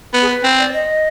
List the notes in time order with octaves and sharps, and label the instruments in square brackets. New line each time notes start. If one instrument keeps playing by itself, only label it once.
[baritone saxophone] B3
[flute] G#4
B4
[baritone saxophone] C4
[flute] D5
D#5